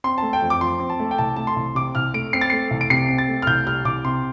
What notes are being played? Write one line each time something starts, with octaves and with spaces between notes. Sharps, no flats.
C4 C6
A3 A5
G5
F2
D6
F3 C6
C4
A5
A3
G5
C2 A5
A3 A5
C6
C2
C3 D6
C2 F6
A3 D7
C4 C7
A6
A3 C7
C2
D7
C3 C7
C4
A6
A3
F6
C2 G6
G3 F6
C2 D6
C3 C6